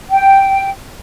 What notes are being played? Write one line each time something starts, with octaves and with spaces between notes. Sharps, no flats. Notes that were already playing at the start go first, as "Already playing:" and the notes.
G5